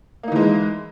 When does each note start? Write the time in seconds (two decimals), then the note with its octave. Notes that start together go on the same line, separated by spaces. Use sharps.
0.23 A#3
0.28 D#4
0.32 E3
0.36 G#3